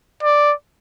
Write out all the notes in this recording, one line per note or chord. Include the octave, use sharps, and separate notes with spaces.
D5